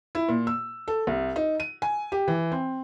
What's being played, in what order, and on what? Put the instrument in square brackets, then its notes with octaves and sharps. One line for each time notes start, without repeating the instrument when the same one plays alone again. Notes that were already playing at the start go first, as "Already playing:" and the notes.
[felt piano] E4
A#2
E6
A4
C2
D#4
D#7
G#5
G4
E3
C4